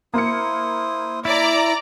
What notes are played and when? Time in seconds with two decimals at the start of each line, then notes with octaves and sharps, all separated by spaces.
0.14 A#3 E4 C5 D#6 C#7
1.25 E4 D5 A#5